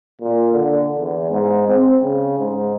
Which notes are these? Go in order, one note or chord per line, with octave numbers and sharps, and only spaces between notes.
A#2
D3
E2
G#2
C4
C#3
G#2